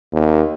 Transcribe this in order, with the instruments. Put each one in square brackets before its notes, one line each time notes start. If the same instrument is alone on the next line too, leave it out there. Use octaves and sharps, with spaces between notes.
[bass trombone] D#2